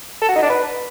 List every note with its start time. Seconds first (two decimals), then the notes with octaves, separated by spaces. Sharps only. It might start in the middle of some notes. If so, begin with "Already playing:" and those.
0.22 A4
0.29 F#4
0.36 D#4
0.43 D4
0.49 B4